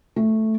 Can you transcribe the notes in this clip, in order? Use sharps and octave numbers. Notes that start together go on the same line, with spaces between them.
A3